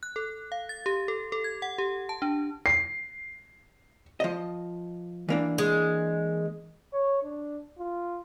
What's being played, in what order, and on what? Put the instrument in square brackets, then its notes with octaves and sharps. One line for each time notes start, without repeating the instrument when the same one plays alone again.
[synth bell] F#6
A4
F5
A6
G4
A4
A4
G#6
F#5
G4
A5
D4
[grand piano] C7
[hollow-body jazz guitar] F3 D#5
E3 A#3 D4
[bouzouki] G#3
[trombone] C#5
D4
F4